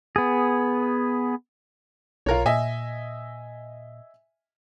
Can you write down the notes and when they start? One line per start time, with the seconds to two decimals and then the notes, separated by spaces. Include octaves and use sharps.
0.16 B3 G#4
2.26 B1 F4 A#4 C#5
2.46 A#2 D#5 E5 G#5